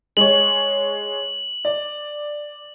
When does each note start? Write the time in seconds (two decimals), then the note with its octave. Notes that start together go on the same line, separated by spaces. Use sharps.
0.17 G#3 C#5 F#7
1.65 D5